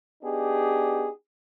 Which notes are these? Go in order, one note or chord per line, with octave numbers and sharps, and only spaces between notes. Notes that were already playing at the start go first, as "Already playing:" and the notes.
B3 D4 D#4 G4 G#4